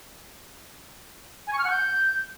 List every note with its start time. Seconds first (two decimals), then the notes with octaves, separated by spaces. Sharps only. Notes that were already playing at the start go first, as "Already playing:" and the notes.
1.47 G#5
1.53 C#6
1.59 F6
1.64 F#5
1.70 G6